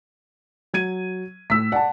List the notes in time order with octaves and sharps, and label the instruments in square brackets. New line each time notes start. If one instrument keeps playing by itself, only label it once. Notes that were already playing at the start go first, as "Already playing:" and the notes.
[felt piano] F#3 G#6 D#7
[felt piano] A2 [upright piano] E6 B6
[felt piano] D5 [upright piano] F#5 A5